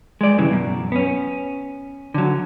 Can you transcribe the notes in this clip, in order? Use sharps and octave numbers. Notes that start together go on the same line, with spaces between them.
G#3 D5
G2 C#3 E3
F#2 B2
B3 C#4
D3 F#3